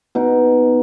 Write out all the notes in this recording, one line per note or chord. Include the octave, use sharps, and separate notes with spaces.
B2 D#4